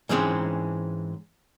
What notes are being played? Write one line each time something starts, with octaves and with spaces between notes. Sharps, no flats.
G#2 E3 G#3 C4 C#4